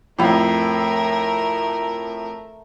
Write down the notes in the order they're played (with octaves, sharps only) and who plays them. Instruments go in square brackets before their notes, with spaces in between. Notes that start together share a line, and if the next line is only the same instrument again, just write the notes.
[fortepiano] F2 A2 [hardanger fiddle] A3 A#4